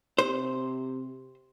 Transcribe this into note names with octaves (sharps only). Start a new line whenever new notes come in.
C3 C5